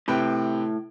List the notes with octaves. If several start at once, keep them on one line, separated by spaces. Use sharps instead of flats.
A2 C3 B4 G5